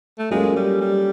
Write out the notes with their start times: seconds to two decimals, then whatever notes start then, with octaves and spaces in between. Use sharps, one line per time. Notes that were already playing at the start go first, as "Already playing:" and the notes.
0.19 A3
0.31 F#3 G#3 A#3 C#4 F4 A4
0.56 G3
0.81 G3